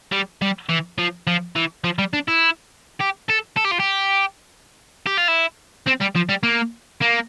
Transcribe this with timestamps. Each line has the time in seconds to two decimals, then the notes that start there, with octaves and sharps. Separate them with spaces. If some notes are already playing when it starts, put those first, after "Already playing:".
0.12 G3
0.42 G3
0.69 E3
0.98 F3
1.27 F3
1.56 E3
1.84 F3
1.99 G3
2.13 D4
2.28 E4
3.00 G4
3.29 A4
3.56 A4
3.64 G4
3.71 F4
3.80 G4
5.07 G4
5.18 F4
5.28 E4
5.86 C4
6.00 G3
6.15 F3
6.29 G3
6.43 A#3
7.02 A#3